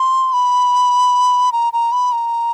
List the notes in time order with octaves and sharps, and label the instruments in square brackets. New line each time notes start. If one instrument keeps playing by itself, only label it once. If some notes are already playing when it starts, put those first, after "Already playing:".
Already playing: [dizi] C6
B5
A#5
A#5
B5
A#5